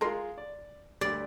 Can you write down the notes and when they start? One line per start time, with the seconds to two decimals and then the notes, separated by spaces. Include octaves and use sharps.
0.01 G#3 F4 A#4 C6
0.38 D5
1.01 D2 G3 D5